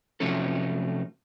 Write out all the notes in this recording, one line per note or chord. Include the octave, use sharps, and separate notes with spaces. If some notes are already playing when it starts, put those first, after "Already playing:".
C3 F3 F#3 A3 C#4 A4